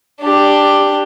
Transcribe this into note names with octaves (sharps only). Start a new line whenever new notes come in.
D4 G4